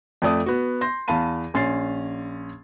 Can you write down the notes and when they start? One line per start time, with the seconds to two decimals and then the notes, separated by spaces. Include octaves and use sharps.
0.22 F2 A3 D5 D#6
0.46 B3 F#4
0.81 C6 G6 A#6
1.08 E2 F5 A5 B5 D#7
1.54 A#1 C#4 C6 A6 C7